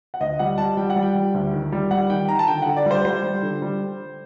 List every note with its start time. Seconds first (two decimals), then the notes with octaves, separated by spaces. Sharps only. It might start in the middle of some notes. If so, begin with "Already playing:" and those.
0.14 F#5
0.20 D2 D#5
0.39 G3 F#5
0.58 G3 A5
0.77 G3 G5
0.90 F#5
0.96 G3
1.02 G5
1.15 G3
1.34 D2
1.53 D#3
1.72 G3
1.91 G3 F#5
2.10 D#3 G5
2.29 D#3 A#5
2.39 A5
2.48 D3 G5
2.62 D3 F#5
2.77 D5
2.86 G3 C5
3.05 G3 C5
3.24 G3
3.43 D3
3.62 G3